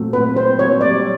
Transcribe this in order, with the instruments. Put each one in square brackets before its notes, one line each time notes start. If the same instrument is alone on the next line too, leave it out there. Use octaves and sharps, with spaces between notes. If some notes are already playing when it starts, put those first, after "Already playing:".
Already playing: [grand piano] A#2 F#3 A3 C4
[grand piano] A#2 [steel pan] B4
[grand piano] C4 [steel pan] C5
[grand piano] F#3 [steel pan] C#5
[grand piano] G3 [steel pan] D5